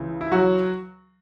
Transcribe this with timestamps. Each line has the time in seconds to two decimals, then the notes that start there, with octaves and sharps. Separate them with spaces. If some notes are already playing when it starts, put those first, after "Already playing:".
Already playing: C#2 C#3 E3
0.21 E4
0.32 F#3 F#4